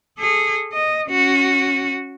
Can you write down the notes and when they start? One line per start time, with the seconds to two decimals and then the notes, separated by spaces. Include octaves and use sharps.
0.19 G#4 A4
0.72 D#5
1.09 C#4 F#4